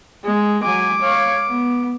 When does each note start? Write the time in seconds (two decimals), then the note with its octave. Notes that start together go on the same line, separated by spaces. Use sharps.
0.24 G#3
0.64 F#3 G#5 D6
1.02 C#5 F5
1.47 B3